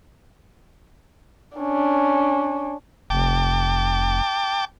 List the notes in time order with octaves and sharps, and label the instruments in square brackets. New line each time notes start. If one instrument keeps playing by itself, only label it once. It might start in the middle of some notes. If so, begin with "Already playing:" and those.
[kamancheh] C#4 D4
[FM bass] F1 [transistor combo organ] G5 A5 D6